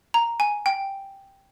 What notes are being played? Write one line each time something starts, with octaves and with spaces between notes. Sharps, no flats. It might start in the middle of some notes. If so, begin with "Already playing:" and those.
A#5
G#5
G5